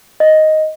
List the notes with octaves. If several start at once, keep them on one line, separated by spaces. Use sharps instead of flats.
D#5